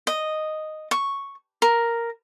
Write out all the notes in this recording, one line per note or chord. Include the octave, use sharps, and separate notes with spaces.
D#5
C#6
A#4